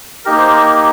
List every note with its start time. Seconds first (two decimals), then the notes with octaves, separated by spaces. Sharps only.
0.25 A#3 D#4 G4 A#4
0.38 C5
0.49 A#4